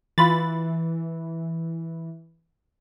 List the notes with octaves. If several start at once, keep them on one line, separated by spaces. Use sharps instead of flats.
E3 F4 B5 A6